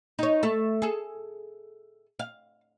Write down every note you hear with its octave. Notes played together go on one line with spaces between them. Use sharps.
D#4 C#5
A3 A4
G#4 A4
F5